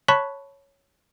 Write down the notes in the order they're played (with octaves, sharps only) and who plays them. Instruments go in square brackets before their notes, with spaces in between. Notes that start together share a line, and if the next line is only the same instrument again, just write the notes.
[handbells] C#5 A5 B5 C#6 F#6 B6